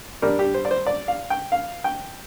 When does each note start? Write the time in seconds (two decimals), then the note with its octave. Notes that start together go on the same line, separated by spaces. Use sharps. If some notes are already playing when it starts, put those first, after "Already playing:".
0.22 G2 G3 D4 A#4
0.39 G4
0.54 C5
0.65 D5
0.71 C5
0.87 D5
1.08 F5
1.30 G5
1.52 F5
1.84 G5